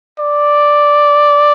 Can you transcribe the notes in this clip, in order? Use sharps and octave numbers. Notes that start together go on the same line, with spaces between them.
D5